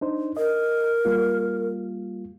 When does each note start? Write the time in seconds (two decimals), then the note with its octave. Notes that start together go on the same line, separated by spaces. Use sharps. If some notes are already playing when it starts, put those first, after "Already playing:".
0.01 D4 D#4 C5
0.37 A#4 D#5
1.05 G3 A#3 F4